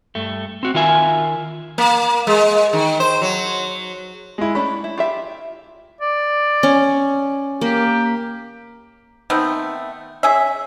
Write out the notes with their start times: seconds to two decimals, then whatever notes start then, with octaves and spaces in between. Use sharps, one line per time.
0.15 G2 A3
0.63 C4 F#4
0.74 D#3 F4 A#4 E5 G#5
1.78 A#3
2.27 G#3
2.73 D#3
3.00 C5
3.22 F#3
4.38 G#3 E4
4.55 A3 C#4 D4 B5
4.84 E4
4.98 F4 G4 E5
6.01 D5
6.63 C#4
7.61 A#3 G4
9.30 D#3 A3 B3 C4
10.23 C#4 G#4 E5